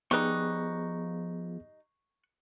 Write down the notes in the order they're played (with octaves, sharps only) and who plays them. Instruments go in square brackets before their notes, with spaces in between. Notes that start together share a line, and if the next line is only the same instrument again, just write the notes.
[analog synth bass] F3 [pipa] G3 D#4 [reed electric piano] B3 G#4 [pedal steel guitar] C#6 F#6